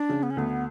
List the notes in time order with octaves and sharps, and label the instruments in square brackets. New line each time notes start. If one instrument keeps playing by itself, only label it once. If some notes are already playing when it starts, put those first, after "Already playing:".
Already playing: [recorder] D4
[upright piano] C#3
[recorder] B3
C#4
[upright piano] D2 [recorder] B3